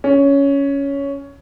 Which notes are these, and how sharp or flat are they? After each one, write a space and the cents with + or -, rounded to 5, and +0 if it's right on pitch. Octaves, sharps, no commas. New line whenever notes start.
C#4 +10